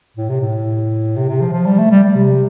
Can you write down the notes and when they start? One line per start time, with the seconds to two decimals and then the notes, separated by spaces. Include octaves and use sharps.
0.17 A2
0.29 C3
0.41 A2
1.17 C3
1.29 C3
1.41 F3
1.53 F3
1.66 G3
1.78 A3
1.91 G3
2.04 G3
2.15 C3